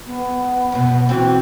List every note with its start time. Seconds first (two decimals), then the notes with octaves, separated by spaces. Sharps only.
0.06 B3
0.72 F#2 B2
0.87 B2
1.09 E3 C4 F#4